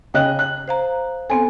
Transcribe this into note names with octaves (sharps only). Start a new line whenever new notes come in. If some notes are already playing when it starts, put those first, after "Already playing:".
C#3 D#5 G5 F#6
F#6
C5 F5 A#5
B3 C4 A4 G#5